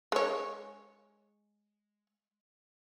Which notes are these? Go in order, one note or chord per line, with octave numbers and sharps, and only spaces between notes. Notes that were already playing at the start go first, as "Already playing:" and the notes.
G#3 C#5